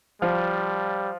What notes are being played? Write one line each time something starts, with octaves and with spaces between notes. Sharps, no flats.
F3 G3